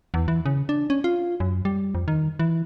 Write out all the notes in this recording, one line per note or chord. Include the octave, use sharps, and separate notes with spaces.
E2
E3
C#3
D4
C#4
F4
F#2
G3
F2
D#3
E3